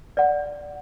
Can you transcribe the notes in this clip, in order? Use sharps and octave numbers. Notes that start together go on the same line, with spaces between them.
D5 F#5